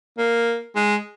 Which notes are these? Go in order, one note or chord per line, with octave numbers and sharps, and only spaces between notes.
A#3
G#3